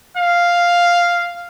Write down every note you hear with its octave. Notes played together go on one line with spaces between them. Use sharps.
F5